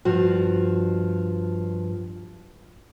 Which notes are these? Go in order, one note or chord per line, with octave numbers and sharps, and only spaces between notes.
G2 F3 F#4